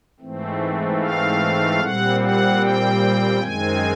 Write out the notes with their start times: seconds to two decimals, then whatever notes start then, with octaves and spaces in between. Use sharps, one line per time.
0.20 G#2 E3 A3 C4
1.00 F5
1.80 A#2 G3 C4 F#5
2.20 F#5
2.59 G5
3.39 F#2 D#3 G#3 C4 G#5